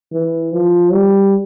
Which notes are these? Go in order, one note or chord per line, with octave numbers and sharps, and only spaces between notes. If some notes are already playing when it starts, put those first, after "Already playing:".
E3
F3
G3